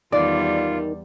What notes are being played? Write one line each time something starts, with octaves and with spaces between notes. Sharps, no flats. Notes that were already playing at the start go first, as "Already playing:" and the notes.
E2 D#3 G3 F4 D5